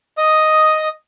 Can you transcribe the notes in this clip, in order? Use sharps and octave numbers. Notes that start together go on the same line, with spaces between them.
D#5 D#6